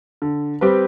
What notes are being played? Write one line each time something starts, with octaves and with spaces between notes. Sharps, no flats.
D3
G3 C4 G4 B4